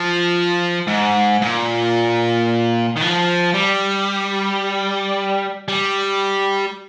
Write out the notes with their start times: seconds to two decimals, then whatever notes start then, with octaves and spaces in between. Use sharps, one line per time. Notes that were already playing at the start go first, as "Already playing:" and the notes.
Already playing: F3
0.88 G#2
1.42 A#2
2.97 D#3
3.02 F3
3.54 G3
5.68 G3